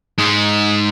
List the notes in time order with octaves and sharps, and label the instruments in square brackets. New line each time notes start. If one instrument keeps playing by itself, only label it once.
[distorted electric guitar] G#2 G#3